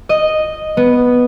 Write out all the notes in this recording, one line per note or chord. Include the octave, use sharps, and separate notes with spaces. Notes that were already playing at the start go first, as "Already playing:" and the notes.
D#5
B3